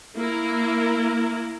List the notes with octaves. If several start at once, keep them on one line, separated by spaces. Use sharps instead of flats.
A#3 E4 A#4